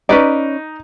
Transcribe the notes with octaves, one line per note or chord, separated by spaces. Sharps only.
C#4 D#4 B4 D5